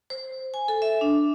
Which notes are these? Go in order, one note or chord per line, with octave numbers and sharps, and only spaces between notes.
C5
G#5
A4
E5
D4